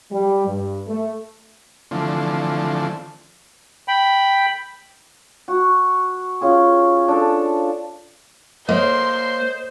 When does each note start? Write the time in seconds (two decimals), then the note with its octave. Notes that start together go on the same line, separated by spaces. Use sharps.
0.12 G3
0.47 G2
0.87 A3
1.91 D3 E3 F3 A3 C4
3.88 G5 B5
5.48 F#4
6.41 C#4 F4 G#4
7.08 D4 A4
8.69 A#3 C5 C#5 D#5 C6